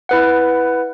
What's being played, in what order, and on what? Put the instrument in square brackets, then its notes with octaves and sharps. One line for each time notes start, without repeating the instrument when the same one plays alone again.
[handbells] E4 B4 F#5